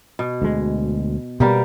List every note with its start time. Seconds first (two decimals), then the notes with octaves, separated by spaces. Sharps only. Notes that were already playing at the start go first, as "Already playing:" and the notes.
0.19 B2
0.42 D2 G#3
1.40 B2 G3 A#3 B3 G4